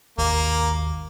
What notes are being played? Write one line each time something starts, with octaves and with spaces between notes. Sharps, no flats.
G#1 D#2 A#3